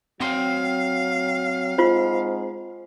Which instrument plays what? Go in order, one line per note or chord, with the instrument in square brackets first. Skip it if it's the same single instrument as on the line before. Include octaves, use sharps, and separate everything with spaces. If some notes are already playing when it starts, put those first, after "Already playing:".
[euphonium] F#3 [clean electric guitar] C4 F#5 C6 [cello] F5
[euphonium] G#2 [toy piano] F4 C5